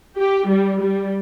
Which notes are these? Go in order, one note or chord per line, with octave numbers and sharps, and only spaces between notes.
G4
G3
G3